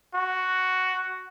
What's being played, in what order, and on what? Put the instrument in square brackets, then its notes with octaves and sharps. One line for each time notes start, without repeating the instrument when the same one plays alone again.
[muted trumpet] F#4